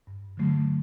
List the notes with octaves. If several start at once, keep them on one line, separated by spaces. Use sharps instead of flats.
G2
D3 F#3 A3